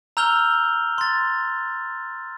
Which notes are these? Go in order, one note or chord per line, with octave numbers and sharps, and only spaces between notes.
A#5 E6 F6 G6 F7 G7
C6 A6